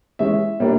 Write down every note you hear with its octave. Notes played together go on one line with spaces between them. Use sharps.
E3 G#3 C#4 E5
A#2 G3 A#3 D4